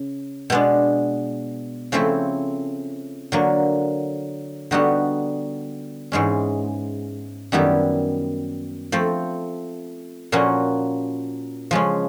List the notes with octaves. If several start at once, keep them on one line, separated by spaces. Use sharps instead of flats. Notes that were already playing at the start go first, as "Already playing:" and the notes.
Already playing: C#3
B2 G#3 B3 D4
C#3 F3 A3 C4 E4
D3 F#3 A#3
D3 G3 B3 D#4 F#4
G#2 E3 G#3 C#4
F#2 D#3 G3 B3 E4
F3 A3 C4
A#2 F3 A#3 C#4 F#4
C#3 F3 G#3 C#4